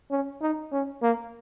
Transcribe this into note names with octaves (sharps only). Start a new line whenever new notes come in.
C#4
D#4
C#4
A#3